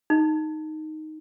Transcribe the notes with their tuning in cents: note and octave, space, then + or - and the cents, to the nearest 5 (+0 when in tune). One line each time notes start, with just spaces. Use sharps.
D#4 +0